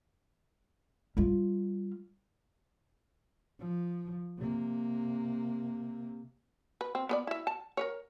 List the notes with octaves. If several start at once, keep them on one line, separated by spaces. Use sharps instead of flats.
G3 F4
F3
C3 A#3
B4
C4
B3 B4 D5
E4 E5
A5
A#4 B4 C#5